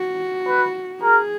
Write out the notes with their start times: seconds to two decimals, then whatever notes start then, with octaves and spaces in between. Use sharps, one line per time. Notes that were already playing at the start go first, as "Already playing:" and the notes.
Already playing: F#4
0.47 B4
1.01 G#4 A#4